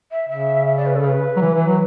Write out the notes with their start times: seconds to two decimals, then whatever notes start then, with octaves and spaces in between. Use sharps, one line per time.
0.11 E5
0.29 C#3 E5
0.66 E5
0.76 D5
0.85 B4
0.95 A4
1.04 C#5
1.07 B4
1.36 F#3
1.41 E3
1.54 E3
1.66 F#3